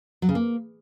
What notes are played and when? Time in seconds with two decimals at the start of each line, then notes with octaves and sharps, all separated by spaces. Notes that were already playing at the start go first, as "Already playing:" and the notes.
0.22 F#3
0.29 C#3
0.35 A#3